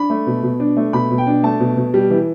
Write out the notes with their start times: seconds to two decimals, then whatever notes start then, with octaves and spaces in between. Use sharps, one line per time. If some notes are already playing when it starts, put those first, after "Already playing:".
Already playing: D4 B5
0.10 A3
0.27 B2
0.43 B2
0.60 D4
0.77 A3
0.93 B2 B5
1.11 B2
1.18 G5
1.27 D4
1.43 A3 A5
1.60 B2
1.77 B2
1.94 G3
2.10 E3